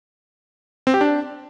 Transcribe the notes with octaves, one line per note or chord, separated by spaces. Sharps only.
C4
G4
D4